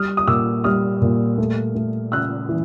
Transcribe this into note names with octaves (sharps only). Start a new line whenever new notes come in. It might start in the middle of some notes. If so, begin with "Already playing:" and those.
Already playing: G3 D#6 F6
D#6
A#2 D6 E6
G3 D#6 F6
A#2
A3
A3
C#3 E6 F#6
E3